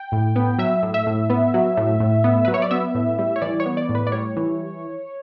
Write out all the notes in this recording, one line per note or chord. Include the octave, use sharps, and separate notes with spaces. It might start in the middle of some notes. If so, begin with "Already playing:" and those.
Already playing: G5
A2
B3
F#3 E5
A2
E5
A2
B3
F#3
A2
A2
B3
F#3 B4
C#5
D5
B3 E5
A2
G3
C#5
E3 D5
C#5
B3
D5
A2
B4
D5
G3 C#5
E3